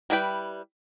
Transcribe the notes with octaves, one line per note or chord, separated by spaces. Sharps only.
G3 E4 B4 G5